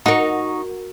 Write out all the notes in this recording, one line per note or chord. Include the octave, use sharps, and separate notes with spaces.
D#4 F#4 A#4 C#6